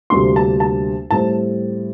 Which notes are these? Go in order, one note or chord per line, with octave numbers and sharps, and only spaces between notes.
D2 C3 G3 A#3 D4 C6
A5
A5
A2 G3 C4 A5